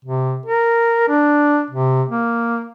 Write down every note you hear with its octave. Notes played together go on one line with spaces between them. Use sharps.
C3
A#4
D4
C3
A#3